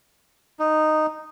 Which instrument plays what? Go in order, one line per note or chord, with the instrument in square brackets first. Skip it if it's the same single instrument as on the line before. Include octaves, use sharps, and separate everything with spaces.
[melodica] D#4